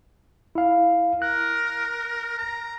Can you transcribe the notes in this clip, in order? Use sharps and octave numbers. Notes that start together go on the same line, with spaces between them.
E4 F5
A#4 F#6
A#5